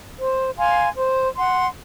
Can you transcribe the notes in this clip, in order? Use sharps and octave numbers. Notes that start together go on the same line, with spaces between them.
C5
F5 G#5 C6
C5
F#5 C6